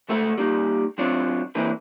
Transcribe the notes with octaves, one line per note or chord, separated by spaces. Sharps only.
C#2 A3 A4 F#5
G3 A#3 D#4
F#3 C4 D4 F4 C#5
E3 A#3 C4 D4 B4